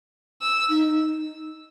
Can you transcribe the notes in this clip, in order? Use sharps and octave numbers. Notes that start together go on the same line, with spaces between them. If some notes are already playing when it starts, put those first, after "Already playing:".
E6
D#4